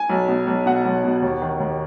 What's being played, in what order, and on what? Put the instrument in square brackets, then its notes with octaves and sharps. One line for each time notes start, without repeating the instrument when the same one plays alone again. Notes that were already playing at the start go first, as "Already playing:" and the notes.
Already playing: [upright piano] G#5
B1
B2
B1
B2 F#5
B1
B2
D#2
D#3
D#2